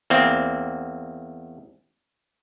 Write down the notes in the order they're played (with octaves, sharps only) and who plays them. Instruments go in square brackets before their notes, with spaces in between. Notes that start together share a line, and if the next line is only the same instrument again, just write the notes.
[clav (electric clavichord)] E2 A#3 C4